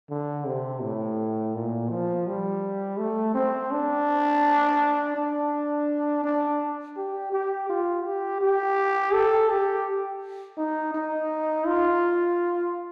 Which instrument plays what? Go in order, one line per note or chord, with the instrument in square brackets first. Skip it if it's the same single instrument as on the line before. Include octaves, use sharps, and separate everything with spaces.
[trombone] D3
C3
A2
A#2
F3
G3
A3
C4
D4
D4
D4
G4
G4
F4
G4
G4
A4
G4
D#4
D#4
F4